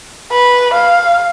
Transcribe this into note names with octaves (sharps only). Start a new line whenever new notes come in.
B4
F5